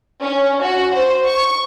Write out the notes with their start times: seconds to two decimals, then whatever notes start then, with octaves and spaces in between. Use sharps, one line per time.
0.23 C#4
0.62 F#4
0.94 C5
1.27 C#6